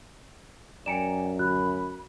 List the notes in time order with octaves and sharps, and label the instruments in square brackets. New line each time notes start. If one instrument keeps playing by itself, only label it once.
[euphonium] F#2 [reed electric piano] D5 G#5 A#5 [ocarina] G5 [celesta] C#7 D7 E7
[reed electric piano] D2 [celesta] F#4 F#6 [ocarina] B5